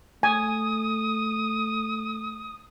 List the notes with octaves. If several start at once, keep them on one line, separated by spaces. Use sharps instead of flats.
A3 G#5 D#6